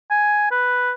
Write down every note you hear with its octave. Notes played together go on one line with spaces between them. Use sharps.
G#5
B4